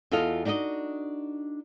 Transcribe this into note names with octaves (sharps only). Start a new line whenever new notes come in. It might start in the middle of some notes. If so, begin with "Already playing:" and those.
E2 F4 F#4 A4 D#5 F5
D4 D#4 F#4 C#5 D#5